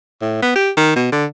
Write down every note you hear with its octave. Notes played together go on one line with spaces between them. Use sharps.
A2
B3
G4
D#3
B2
D3